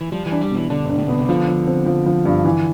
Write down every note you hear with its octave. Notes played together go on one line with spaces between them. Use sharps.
E3
F3 G3
E3
D4
G3
B2 E3
D3 D4
G2 D4
A2
B2 B3
C3
D3 F3
F3
C4
F3
F3
G2
E3